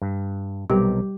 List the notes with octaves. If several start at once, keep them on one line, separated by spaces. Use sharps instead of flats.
G2
B1 C3 G3 G4 A#4